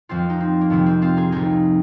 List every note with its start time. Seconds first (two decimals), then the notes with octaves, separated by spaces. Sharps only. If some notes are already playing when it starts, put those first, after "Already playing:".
0.09 F2 F3 G#3 C4 F4
0.30 D#4
0.40 C4
0.61 A#3
0.70 F2 C3 F3 G#3 C4
0.86 C4
1.02 C4 F4
1.17 D#4 G#4
1.32 C2 C3 F3 D#4 G#4